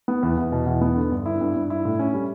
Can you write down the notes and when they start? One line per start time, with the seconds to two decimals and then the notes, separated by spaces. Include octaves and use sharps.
0.08 B3
0.23 E2
0.37 E2
0.52 B2
0.66 E2
0.81 B3
0.97 D3
1.12 G2
1.26 E4
1.41 G2
1.56 G2
1.70 E4
1.85 A2
1.99 C#4
2.14 G3